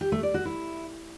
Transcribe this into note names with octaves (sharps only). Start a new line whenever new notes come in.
G4
A3
D5
F#4
E4